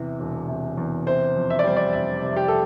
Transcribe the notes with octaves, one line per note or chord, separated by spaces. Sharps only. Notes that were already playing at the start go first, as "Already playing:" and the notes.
Already playing: E2 C3 E3
E1
C3
E2
C3 C5
F2
E5
D5
G3 C5
D5
F1 E5
C3
G4
A4